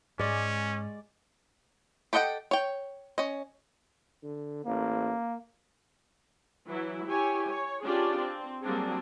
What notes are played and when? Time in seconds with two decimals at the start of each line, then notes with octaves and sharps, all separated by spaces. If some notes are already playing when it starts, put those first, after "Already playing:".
0.19 G#2 G#3 C#4 D5
2.13 G4 A4 D#5 F#5 G5
2.51 C#5 G5
3.18 C#4 D#5
4.23 D3
4.66 A1 A#3
6.67 E3 F#3 E4
7.07 E4 G4 C#5 G#5
7.48 C#5
7.84 C#4 D4 F4 G4 G#4 D5
8.19 C4
8.62 F#3 G3 A#3 C4 D4 G#4